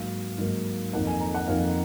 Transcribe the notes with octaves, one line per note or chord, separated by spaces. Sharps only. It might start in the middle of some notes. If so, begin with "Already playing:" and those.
Already playing: G#2 F#3 A#3 F5
G#2 F#3 A#3
F2 D#3 A#3 D#4 F#5
G#5
A#5
F#5
F2 D#3 A#3 D#4 F5